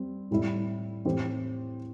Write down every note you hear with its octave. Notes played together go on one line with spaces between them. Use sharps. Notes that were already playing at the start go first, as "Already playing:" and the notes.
Already playing: G3 C4
A2 G3 E4
A2 E3 C4 G4 C5